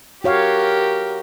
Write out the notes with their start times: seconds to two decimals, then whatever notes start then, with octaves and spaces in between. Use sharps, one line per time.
0.24 F#4 G4 A#4 C#5 F5